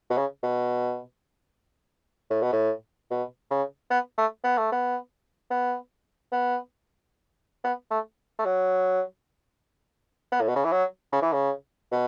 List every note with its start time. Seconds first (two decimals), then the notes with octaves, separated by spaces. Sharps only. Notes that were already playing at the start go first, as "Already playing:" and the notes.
0.10 B2
0.17 C#3
0.43 B2
2.30 A2
2.42 B2
2.53 A2
3.11 B2
3.50 C#3
3.90 B3
4.18 A3
4.44 B3
4.58 A3
4.72 B3
5.51 B3
6.32 B3
7.64 B3
7.91 A3
8.39 A3
8.45 F#3
10.32 B3
10.41 A2
10.48 B2
10.56 C#3
10.64 E3
10.72 F#3
11.13 C#3
11.22 E3
11.32 C#3
11.92 B2